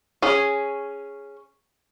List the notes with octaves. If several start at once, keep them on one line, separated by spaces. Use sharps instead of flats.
C#4 G#4